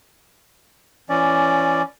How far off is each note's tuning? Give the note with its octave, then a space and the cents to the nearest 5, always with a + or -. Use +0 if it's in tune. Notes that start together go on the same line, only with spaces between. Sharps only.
E3 +30 C#4 +0 D5 +0